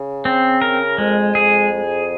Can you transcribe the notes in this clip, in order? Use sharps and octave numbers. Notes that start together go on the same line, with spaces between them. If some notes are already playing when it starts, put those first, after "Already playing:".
Already playing: C#3
C4
A#4
F2 G#3
G#4